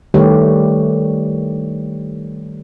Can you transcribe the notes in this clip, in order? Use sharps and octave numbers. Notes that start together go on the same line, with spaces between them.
D#3 G3 A3 G4 B4 C#5